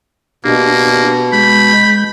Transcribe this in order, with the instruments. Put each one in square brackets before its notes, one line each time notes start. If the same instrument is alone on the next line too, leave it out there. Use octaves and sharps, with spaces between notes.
[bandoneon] B2 [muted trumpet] A#3 [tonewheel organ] D4 G4
[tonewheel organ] G#3 G6 [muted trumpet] B5